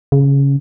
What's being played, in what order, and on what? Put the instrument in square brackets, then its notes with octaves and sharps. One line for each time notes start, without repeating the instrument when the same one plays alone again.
[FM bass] C#3